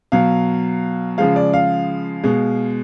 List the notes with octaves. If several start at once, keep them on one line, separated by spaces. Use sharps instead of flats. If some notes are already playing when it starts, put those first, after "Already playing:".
B2 F#3 F5
C#3 F3 G#3 F5
D5
F5
B2 G#3